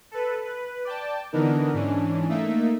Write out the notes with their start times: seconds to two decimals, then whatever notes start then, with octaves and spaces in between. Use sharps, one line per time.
0.11 A4 B4
0.45 B4
0.85 D5 G5 A5
1.32 D3 E3 B3 D4 D#4 A#4
1.74 G#2 E3 C#4 D4
2.29 A3 A#3 D#4 E5